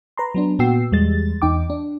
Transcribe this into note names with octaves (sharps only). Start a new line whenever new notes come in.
B4 A#5 C6
F#3 B3 D4
A#2 B3 F#4 G5 E6 C7
E2 G3 G#3 A6
E2 D#4 G5 D6
D4